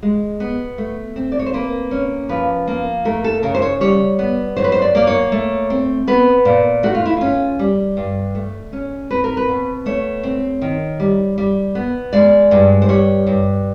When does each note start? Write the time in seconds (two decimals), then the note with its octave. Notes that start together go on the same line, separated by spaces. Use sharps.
0.03 G#3
0.40 B3
0.78 A3
1.16 C4
1.32 D5
1.39 C#5
1.46 C5
1.53 A#3 B4
1.91 C#4
2.29 F3 B4
2.67 A#3
3.05 A3 A#4
3.24 A4
3.43 C#3 A#4
3.55 C5
3.62 C#5
3.81 G3 C#5
4.19 B3
4.56 F#3 C5
4.64 B4
4.72 C5
4.82 D5
4.95 A#3 D5
5.07 C#5
5.32 A3
5.70 C4
6.07 B3 B4
6.45 A#2
6.83 A3 F#4
6.95 F4
7.06 E4
7.17 C#4 F4
7.59 G3
7.97 G2
8.35 A3
8.73 C#4
9.10 C4 B4
9.24 A#4
9.37 B4
9.49 B2
9.86 A3 C#5
10.23 C4
10.62 D#3
11.00 G3
11.38 G3
11.75 B3
12.13 G#3 D5
12.51 G2
12.82 C5
12.89 G3 C#5
13.27 G2